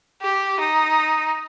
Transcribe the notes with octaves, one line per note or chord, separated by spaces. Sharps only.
G4
D#4